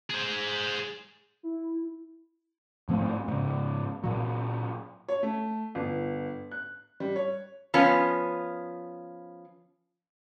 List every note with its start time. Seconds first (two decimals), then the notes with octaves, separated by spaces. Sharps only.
0.10 G#4 C5
1.43 E4
2.89 G#2 F3 A3 C4
3.28 G#2 C#3
4.04 A#2 F#3
5.09 C#5
5.23 A3
5.75 G1
6.51 F#6
7.00 G3
7.16 C#5
7.74 F3 B3 C#4